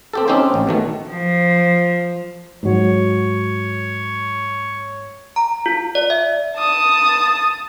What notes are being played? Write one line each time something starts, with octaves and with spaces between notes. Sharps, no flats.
C4 G4 A4
C4 C#4 D#4 G4 C5
A1
B2 D#3 A3
F3
G#2 F#3 C#5
A#5
F4
D5
E5
A5 D#6